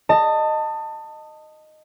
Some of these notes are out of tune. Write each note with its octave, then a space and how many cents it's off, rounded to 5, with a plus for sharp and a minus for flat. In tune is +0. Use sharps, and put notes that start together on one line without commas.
D#5 -10 A5 +25